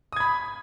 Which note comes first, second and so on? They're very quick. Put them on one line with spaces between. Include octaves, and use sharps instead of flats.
D#6 G#6 B5